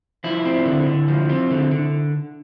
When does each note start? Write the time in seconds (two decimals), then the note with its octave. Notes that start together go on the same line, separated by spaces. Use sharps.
0.24 F3 E4
0.45 C4
0.66 D3
0.87 D3
1.08 F3
1.30 C4
1.51 D3
1.71 D3